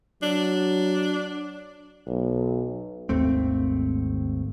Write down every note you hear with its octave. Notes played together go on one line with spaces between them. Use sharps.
F#3 D4
B1
G#1 D#2 A3 C4